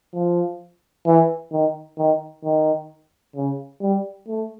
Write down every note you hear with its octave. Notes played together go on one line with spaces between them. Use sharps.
F3
E3
D#3
D#3
D#3
C#3
G3
A3